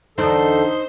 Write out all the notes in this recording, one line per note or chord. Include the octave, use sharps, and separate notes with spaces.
E2 D3 D4 D#4 A4 C5